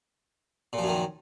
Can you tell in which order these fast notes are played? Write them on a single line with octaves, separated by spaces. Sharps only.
A#2 F3 F#2 D#3